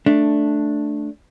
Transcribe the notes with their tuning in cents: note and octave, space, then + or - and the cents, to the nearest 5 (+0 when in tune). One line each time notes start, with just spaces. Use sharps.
A3 -5 D4 +0